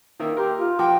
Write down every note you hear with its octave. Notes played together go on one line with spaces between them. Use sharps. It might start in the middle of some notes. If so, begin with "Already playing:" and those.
D#3 A#3 E5
G4 A#4 C6
F4
F3 F#4 G5 D6